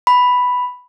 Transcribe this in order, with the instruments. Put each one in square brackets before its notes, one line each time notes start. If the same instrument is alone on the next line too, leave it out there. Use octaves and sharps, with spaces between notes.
[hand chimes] B5